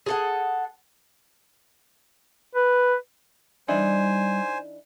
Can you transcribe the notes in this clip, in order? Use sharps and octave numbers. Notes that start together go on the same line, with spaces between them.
G#4 A4 F#5
B4
E3 G3 D4 D#4 C5 G#5